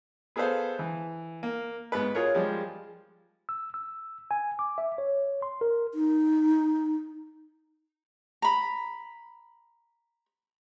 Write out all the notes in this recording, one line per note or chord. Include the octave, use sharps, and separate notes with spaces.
B3 G#4 A4 B4 C5 F5
E3
A#3
G#2 B3 B4
F4 G#4 A#4 C#5
F3 G3 G#3
E6
E6
G#5
D6
E5
C#5
C6
A#4
D#4
A#5 B5